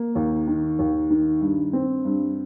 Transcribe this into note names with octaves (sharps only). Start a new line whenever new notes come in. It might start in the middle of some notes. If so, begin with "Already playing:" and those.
Already playing: A#3
D#2
D#3
D#2
D#3
G2
C4
G2